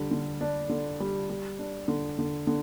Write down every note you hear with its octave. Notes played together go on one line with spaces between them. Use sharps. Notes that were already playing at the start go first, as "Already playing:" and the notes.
Already playing: D3 G3
D3
D4
D3
G3
G3
D4
D3
D3
D3